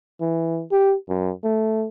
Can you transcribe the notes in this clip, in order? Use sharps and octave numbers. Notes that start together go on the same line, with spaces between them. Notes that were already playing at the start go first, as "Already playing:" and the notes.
E3
G4
F#2
A3